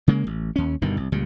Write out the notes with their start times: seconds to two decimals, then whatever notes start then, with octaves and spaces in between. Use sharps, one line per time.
0.08 C#3 G#3 A#3
0.27 A1
0.56 D#2 C#4
0.82 G1 G2 B2 D#3
0.97 C2
1.12 C#2 A#2 G3